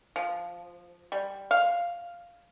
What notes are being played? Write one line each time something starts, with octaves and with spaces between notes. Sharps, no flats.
F3
G3
F5